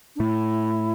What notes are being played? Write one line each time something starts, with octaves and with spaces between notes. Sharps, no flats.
D4
A2 A3 E4